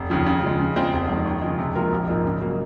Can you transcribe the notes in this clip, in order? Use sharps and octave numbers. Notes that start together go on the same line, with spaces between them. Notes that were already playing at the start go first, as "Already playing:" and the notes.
Already playing: F1
D#2 C#3 F3
C#3
F3 G#3
C#3
G#3 C4 F4
F1
F2 D#3
D#2
C#3 F3 G#3
C3
F3 A#3 F4 A#4
A#1
G#2 F3 A#3 D#4
C#3
F#3 A#3